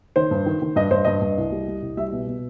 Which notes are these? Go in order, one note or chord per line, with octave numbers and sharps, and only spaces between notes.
D#3 C5
G2
D#3
D#3
G2 D#5
G2 C5
G2 D#5
G2
C2
G3
G3
C2
G3 E5
B2
B2